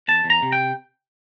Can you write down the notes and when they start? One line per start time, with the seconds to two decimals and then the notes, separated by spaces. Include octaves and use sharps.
0.08 E2 A5
0.24 E2
0.30 A#5
0.42 C3
0.52 G5